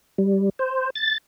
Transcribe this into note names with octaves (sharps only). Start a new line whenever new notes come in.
G3
C5
A6